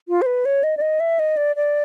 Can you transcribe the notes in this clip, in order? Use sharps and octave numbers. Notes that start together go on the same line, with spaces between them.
F4
C5
B4
C#5
D#5
D5
D#5
E5
D#5
D5
D5